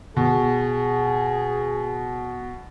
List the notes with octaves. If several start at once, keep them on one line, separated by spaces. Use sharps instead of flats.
B2 G#4